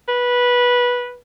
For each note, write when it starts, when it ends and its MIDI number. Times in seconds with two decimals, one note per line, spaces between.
0.08 1.17 71